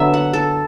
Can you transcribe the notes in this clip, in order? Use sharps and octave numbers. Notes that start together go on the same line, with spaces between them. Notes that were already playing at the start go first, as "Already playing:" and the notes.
Already playing: D3 F#3 B3 E5
F#5
A4